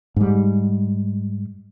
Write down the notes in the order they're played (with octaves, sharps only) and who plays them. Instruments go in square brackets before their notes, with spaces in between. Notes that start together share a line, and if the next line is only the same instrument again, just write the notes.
[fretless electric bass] G#2 G3